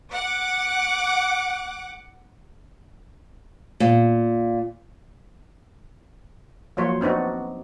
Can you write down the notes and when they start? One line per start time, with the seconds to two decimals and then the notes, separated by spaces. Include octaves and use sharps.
0.13 F#5 D6
3.80 A#2
6.77 F3 F#3 A#3 C5 C#5
7.01 B3 C4 D4 D#4 F#4